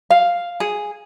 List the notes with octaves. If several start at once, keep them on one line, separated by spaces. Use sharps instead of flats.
F5
G#4